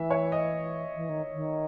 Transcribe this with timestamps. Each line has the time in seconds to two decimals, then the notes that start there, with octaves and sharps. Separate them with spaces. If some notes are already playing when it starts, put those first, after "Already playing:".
Already playing: E3 E5
0.10 C#5
0.32 D#5
0.96 E3
1.09 D#3
1.33 D#3